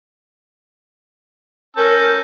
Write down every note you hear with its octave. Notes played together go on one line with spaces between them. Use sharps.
C#4 A#4 A5 E6 G6